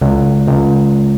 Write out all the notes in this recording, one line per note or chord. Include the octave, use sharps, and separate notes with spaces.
C#2
C#2